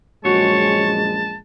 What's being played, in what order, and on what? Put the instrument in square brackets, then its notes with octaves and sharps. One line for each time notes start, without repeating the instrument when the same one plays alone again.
[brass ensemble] A#1 F#2 G#3 [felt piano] F#4 [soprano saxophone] C#5 [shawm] A5